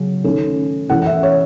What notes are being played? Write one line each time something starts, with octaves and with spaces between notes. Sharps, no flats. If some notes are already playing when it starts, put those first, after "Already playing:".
Already playing: C#3 F#3 C#4
D#3 A3 C#4
E3 A3 C#4 F#5
F#5
E5
C#5